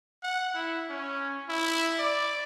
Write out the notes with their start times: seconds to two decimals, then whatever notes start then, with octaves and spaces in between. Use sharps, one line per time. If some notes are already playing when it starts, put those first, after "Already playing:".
0.23 F#5
0.54 E4
0.89 C#4
1.49 E4
1.99 D5